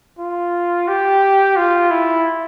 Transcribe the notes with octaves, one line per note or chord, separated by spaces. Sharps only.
F4
G4
F4
E4